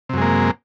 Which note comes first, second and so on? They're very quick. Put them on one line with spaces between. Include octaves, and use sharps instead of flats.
C3 F#2 G#3 A#3